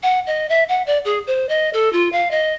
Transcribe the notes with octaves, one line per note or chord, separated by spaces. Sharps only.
F#5
D#5
E5
F#5
D5
G#4
C5
D#5
A4
F4
F5
D#5